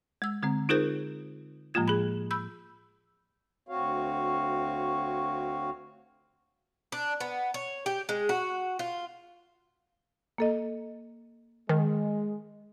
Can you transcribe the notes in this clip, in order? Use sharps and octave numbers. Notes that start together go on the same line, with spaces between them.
G#3 E6
D3 G#3 C4
D#4 F4 G#4 A#4 C5 G6
A2 F3 G#3 A#3 F4 G#6
G#4 B5
B5 E6 G6
D2 C4 F#4 C#5 F5
D4
B3
C#5
G4
G#3
F#4
F4
A#3 A4 D#5
D#3 G#3